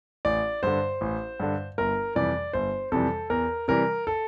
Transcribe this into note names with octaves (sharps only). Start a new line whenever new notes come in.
A1 D5
G2 D3 C5
A1
G2 D3
G1 A#4
F2 C3 E3 G3 D5
G1 C5
F2 C3 E3 G3 A4
E2 A#4
C3 E3 G3 A#4
A4